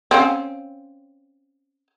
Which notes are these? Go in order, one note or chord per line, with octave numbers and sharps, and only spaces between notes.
C4 C#4 F5